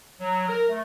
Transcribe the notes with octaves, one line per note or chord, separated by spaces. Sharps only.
F#3
A#4
A3